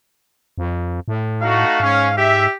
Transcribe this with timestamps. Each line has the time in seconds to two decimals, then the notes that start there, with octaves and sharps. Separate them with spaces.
0.58 F2
1.08 A2
1.42 A3 D#4 F#4 F5
1.80 G#2 C#4
2.17 G4 E5